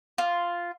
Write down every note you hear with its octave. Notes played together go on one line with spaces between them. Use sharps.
F4